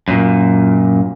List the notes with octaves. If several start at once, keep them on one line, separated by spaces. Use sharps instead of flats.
F#2 A#2